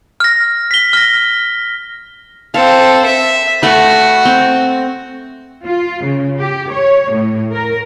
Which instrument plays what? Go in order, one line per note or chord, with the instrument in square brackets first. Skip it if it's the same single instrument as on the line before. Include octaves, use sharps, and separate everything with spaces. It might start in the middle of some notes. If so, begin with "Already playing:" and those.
[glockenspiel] F6 A#6
B6 G7
F6 A#6
[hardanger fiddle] C4 A4 [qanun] F5
[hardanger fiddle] E5
[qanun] A3 B4 [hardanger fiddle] F#4
[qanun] C4
[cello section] F4
C#3
G4
C#5
A2
A#4